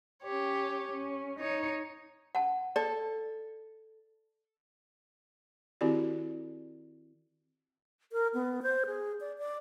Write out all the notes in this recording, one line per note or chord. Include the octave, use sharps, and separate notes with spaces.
C#4 G4 C#5
C#4
D#4 C#5
F#5 A5
A4 D5
D#3 C4 E4 F#4 G4 D5
A#4
B3
C5
G#4
D5
D5